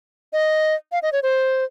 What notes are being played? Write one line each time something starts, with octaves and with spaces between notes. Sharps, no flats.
D#5
F5
D#5
C#5
C5